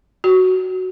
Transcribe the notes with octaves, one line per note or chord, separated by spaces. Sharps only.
F#4